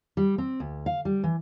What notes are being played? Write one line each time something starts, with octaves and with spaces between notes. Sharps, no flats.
G3
C4
D2
F5
G3
E3